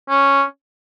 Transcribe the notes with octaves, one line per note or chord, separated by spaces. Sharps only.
C#4